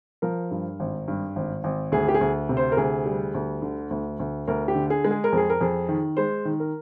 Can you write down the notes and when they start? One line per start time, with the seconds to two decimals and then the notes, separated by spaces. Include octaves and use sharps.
0.22 F3 A#4
0.51 G2
0.80 G#1
1.08 G2
1.36 G#1
1.64 G#1
1.92 D2 G#4
2.08 G4
2.14 G#4
2.21 D2
2.49 C3
2.57 C5
2.72 A#4
2.77 D2 G#4
3.05 G3
3.34 D2
3.62 D3
3.91 D2
4.20 D2
4.48 D2 A#4
4.68 G4
4.75 D3
4.90 G#4
5.05 G#3
5.11 G#4
5.24 A#4
5.33 F2 G#4
5.50 A#4
5.61 F2 G#4
5.89 D#3
6.17 G#3 C5
6.45 D#3
6.60 A#4